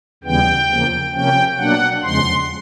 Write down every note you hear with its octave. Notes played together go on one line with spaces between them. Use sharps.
D#2 C#3 E3 G3 B3 G5
E2 C#3 F3 A#3
C3 F3 A#3 C#4 G5
B2 F#3 A#3 D4 F#5
E2 C#3 F3 G#3 C6